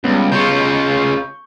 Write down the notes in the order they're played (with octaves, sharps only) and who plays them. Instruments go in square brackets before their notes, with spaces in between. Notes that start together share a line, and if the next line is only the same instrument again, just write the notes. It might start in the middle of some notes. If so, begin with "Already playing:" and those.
[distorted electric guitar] C#2 [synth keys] G3 B3
[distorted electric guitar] C#3 F4 [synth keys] C#6 G6